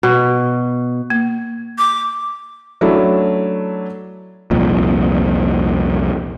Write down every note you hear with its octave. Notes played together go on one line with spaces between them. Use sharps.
B2
A#3
D6
F#3 A3 C#4 D4 E4
C2 F2 A#2